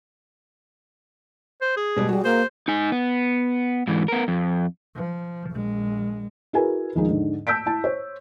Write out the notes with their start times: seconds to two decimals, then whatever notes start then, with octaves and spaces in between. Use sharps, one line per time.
1.61 C5
1.77 G#4
1.96 B2 G3 G#3
2.09 G3 F#4 G#4
2.24 A#3 C5
2.68 D#4 G#5
2.92 B3
3.87 G#2 E3
4.08 B3 A#4
4.28 F2
4.96 F3
5.51 A#1 G#3
6.53 E4 F#4 G#4 A#4 B4 G#5
6.95 D#2 F3 G#3 D#4
7.08 G#2 D3
7.47 A5 E6 G6 B6 D7
7.66 E4 A5
7.84 C5 C#5